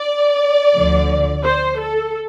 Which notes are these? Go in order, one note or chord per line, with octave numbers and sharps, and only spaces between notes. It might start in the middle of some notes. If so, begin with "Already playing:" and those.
Already playing: D5
D2 D3 F3
C5
A4